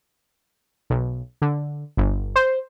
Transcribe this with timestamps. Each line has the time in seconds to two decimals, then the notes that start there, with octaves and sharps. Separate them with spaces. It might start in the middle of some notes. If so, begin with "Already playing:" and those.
0.90 B1
1.42 D3
1.97 G1
2.36 C5